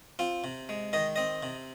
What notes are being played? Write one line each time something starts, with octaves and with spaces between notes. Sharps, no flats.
C4 F4
C3
G#3
D#3 D#5
C4 D#5
C3